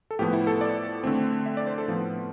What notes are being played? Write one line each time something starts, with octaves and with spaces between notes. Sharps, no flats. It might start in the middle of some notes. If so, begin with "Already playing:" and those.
A4
A2 F3 B3 G4
E4
A4
D5
D3 A3 C4
E5
D5
C5
A4
A2 F3 B3 F4